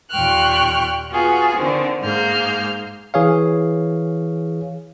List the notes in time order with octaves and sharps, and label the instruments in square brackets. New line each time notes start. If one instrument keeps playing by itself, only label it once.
[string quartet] D#2 A#2 G5 C#6 F6 F#6
B3 F4 F#4 G#4
D3 D#3 C4
G#2 A#3 G#4 F6 G6
[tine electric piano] E3 G#4 C#5 F5